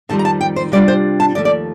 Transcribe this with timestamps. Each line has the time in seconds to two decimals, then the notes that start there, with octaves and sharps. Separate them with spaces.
0.09 F2 D#3 G3 C4 F4 A5
0.19 A#5
0.25 A5
0.41 G5
0.56 C5
0.72 C3 G3 D4 F4 D5
0.88 C5
1.20 A5
1.35 D#2 D3 F3 A3 D5
1.45 D5